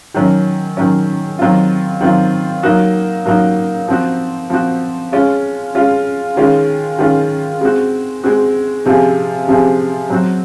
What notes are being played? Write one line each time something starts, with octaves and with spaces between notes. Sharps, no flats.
D#3 F#3 C#4
D#3 F#3 C#4
D#3 F#3 C4 F4
D#3 F#3 C4 F4
F#3 A#3 D#4 F#4
F#3 A#3 D#4 F#4
F3 C4 F#4
F3 C4 F#4
G#3 C#4 F4
G#3 C#4 F4
D#3 G#3 C#4 F4
D#3 G#3 C#4 F4
G#3 C4 F#4
G#3 C4 F#4
C3 F3 C4 F4 G#4
C3 F3 C4 F4 G#4
F#3 C4 F#4